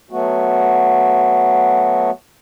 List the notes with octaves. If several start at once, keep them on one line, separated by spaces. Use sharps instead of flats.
F#3 A3 B3 F#4